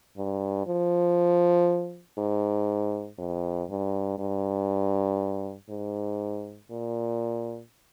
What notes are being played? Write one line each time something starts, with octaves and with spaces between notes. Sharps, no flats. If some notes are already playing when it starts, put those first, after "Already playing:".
G2
F3
G#2
F2
G2
G2
G#2
A#2